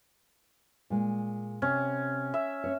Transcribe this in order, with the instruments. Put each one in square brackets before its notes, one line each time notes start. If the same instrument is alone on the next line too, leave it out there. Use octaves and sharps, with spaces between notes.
[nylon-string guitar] A#2 G#3
[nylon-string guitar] C3 [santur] C#4
[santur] E5
[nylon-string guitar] C#4 C#5